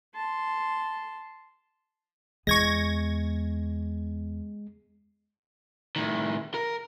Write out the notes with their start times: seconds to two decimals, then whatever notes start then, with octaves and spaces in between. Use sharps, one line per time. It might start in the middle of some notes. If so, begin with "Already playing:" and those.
0.16 A5 C6
2.47 E2 G#3 B3 C#6 G#6 A#6
5.96 A2 D#3
6.54 A#4